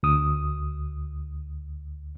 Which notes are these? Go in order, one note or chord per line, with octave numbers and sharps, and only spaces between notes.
D2 D#6